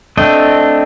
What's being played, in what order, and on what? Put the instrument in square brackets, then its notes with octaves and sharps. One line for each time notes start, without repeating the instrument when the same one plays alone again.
[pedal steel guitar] A3 C4 D4 D#5